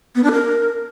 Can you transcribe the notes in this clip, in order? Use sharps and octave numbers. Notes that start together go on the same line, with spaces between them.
B3
D4
A#4